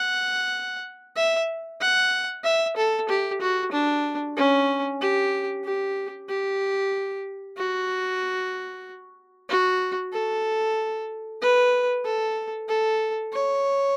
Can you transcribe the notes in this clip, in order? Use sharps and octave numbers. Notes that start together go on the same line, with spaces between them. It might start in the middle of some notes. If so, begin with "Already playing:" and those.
Already playing: F#5
E5
F#5
E5
A4
G4
F#4
D4
C#4
G4
G4
G4
F#4
F#4
A4
B4
A4
A4
C#5